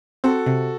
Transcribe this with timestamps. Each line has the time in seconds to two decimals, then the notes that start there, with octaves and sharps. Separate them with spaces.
0.24 C4 F#4 A4
0.46 C3